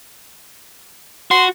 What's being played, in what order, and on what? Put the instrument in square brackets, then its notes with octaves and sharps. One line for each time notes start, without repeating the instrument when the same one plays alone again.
[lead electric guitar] F#4 [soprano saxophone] C6